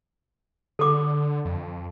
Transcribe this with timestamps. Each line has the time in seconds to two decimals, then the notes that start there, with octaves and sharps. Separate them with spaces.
0.79 D3 A4 D6
1.45 F2